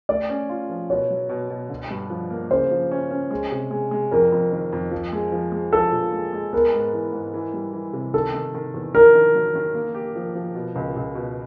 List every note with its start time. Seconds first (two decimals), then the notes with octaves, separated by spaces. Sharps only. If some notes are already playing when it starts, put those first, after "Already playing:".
0.09 A3 D5
0.30 C#4
0.49 F4
0.70 F3
0.90 B2 C#5
1.10 F#3
1.29 B2
1.50 B2
1.70 D3
1.91 G2
2.10 F3
2.30 A#3
2.51 C#3 C5
2.71 F3
2.92 C#4
3.11 C#4
3.31 G#3
3.52 C3
3.71 G#3
3.91 G#3
4.11 F2 A#4
4.32 F2
4.52 D#3
4.73 F2
4.91 F3
5.13 G#3
5.32 F3
5.52 G#3
5.72 F3 A4
5.92 A#2
6.12 G#3
6.33 G#3
6.53 B3 A#4
6.74 G#2
6.93 E3
7.13 G#2
7.34 E3
7.54 G3
7.73 E3
7.93 C3
8.14 D#3 A4
8.34 D#3
8.54 D#3
8.74 E2
8.94 D#3 A#4
9.15 D#3
9.35 F#3
9.55 D#3
9.74 A#3
9.94 G4
10.16 F3
10.35 F3
10.55 B2
10.75 C#2
10.96 C#2
11.15 B2